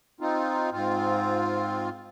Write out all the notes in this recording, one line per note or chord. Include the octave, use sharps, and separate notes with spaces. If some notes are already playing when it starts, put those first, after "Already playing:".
C4 D#4 F4
G#2 C4 F4